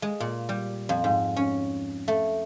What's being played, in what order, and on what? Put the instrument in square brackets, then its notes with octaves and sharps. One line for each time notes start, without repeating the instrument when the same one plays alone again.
[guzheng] G#3
A#2
G3
F2
G#2
C#4
A3